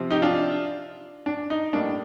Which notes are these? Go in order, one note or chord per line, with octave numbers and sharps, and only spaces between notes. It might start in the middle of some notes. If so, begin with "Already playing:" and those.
Already playing: C3 F3 C4
D#4 G4
D4 F4
D4
D#4
A2 G3 A#3 D4